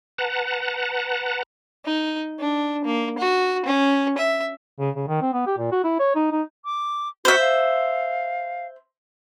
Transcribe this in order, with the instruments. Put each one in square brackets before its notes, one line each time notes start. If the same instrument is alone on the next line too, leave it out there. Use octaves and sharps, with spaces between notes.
[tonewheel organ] B4 F#5 A5 A#5
[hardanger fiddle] D#4
D4
A#3
F#4
C#4
E5
[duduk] C#3
C#3
D#3
C4
B3
G4
A#2
F#4
E4
C#5
D#4
D#4
[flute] D6
[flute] F#4 [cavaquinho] C5 E5
[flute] F5